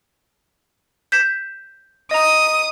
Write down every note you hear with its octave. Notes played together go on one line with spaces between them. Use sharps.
G6 B6 E7
D#5 A#5 D#6